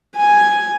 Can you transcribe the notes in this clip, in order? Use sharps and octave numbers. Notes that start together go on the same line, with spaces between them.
G#5